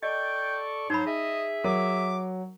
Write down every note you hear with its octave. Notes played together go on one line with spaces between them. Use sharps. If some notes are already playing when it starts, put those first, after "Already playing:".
A4 D5 D#5 G5 C#6
G#2 F#3 D#4 C5 B5
G#4 D#5 E5
F#3 A#4 D6